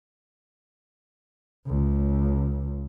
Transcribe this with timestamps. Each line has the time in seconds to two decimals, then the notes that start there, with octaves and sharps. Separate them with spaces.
1.67 C#2